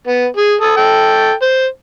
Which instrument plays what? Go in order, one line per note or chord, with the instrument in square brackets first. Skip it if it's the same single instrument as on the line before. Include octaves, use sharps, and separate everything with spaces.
[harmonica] B3
G#4
A4 D#6
A4 G5
C5